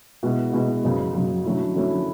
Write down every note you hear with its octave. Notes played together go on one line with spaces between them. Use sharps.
B2 G#3 B3 E4
B2 G#3 B3 E4
F#2 C#3 F#3
F#2 C#3 F#3
D3 F#3 A3 C#4 E4
D3 F#3 A3 C#4 E4